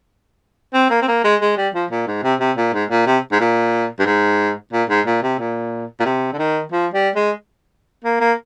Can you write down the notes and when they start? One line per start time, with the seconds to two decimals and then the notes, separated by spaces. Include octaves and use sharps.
0.73 C4
0.90 A#3
1.02 C4
1.08 A#3
1.24 G#3
1.41 G#3
1.57 G3
1.74 F3
1.91 A#2
2.07 G#2
2.23 C3
2.40 C3
2.57 A#2
2.73 G#2
2.90 A#2
3.06 C3
3.32 G#2
3.40 A#2
3.99 G2
4.06 G#2
4.72 A#2
4.89 G#2
5.06 A#2
5.22 C3
5.39 A#2
6.00 A#2
6.05 C3
6.33 D3
6.38 D#3
6.72 F3
6.94 G3
7.15 G#3
8.04 A#3
8.21 A#3